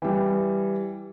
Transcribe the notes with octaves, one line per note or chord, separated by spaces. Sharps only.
E3 G3